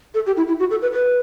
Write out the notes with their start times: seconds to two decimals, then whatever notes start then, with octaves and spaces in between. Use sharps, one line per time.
0.14 A4
0.26 G4
0.37 E4
0.48 E4
0.60 F#4
0.70 A4
0.82 B4
0.93 B4